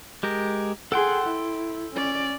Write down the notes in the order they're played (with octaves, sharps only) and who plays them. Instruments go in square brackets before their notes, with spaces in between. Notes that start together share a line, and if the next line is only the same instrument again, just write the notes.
[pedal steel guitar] G#3 G4 A#4
[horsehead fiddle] G#4 F#5 [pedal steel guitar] A4 G5 C6
[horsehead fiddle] E4
C#4 D5